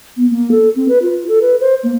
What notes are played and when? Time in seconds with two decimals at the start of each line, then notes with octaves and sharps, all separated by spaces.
0.17 B3
0.31 A#3
0.51 A4
0.76 C4
0.89 B4
1.02 F4
1.28 A4
1.41 B4
1.61 C5
1.83 A#3